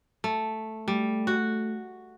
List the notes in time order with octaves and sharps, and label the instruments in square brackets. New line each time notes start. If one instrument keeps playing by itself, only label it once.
[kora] A3
[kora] G3 [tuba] A3
[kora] F#4